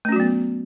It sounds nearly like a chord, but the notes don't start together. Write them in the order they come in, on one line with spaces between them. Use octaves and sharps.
A3 C#4 F#4 F#3 B3